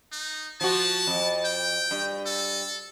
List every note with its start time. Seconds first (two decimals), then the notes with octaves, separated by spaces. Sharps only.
0.12 D#4
0.61 F3 F#4 A5
1.07 F2
1.45 G5
1.91 G2
2.26 A4